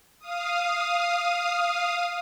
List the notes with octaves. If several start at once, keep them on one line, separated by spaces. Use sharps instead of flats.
F5 D#6